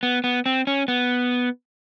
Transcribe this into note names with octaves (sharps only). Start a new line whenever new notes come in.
B3
B3
C4
C#4
B3